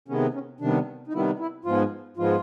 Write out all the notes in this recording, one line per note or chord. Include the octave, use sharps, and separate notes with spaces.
C3 D#3 G#3 B3 C#4
C4
C#4
C3 D#3 G3 B3 D4
D#4
C3 D#3 G3 B3 E4
E4
G#2 F3 G#3 B3 F4
G#2 F3 G#3 B3 F4